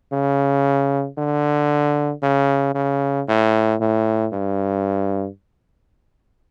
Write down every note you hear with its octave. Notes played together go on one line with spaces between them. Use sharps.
C#3
D3
C#3
C#3
A2
A2
G2